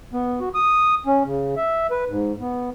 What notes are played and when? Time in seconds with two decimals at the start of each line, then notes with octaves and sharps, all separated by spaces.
0.13 B3
0.40 F#4
0.55 D#6
1.06 C#4
1.26 C#3
1.57 E5
1.91 B4
2.09 G#2
2.40 B3